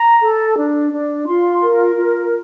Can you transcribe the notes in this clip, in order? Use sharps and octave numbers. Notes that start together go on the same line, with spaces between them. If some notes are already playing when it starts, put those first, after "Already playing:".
Already playing: A#5
A4
D4
D4
F4 C6
A#4
F4